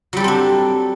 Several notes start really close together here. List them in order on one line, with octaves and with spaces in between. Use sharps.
F#3 G3 A4 C4 D4